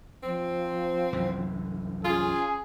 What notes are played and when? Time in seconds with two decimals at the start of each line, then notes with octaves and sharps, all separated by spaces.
0.23 F3 C4
1.12 C2 F#2 E3
2.04 C#4 F4 G#4